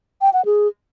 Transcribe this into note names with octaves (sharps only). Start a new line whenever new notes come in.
G5
F#5
G#4